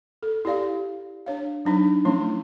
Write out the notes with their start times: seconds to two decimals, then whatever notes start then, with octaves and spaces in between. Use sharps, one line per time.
0.23 A4
0.45 E4 G4 D5 F5
1.26 D4 C#5 F5
1.65 F#3 D4 D#4
2.05 F3 A3 C#4 E4